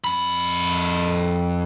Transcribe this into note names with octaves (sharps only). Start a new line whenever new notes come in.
F2 B5